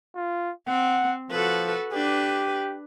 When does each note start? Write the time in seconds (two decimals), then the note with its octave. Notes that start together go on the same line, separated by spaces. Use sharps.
0.15 F4
0.68 C4 F#5
1.31 F3 F#4 A4 B4
1.92 D4 G4 B4